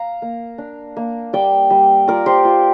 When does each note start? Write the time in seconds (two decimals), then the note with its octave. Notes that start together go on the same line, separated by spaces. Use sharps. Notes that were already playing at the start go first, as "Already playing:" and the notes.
Already playing: F5 A#5
0.22 A#3
0.58 D4
0.97 A#3
1.33 G3 D5 G5
1.70 G3
2.08 F4 A#4 D5
2.26 G4 C5
2.45 F4